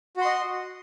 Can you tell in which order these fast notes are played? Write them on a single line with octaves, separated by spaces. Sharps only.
F#4 C6 D#5